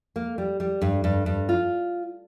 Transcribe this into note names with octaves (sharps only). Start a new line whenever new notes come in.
A#3
G3
G3
G2
G2
G2
F4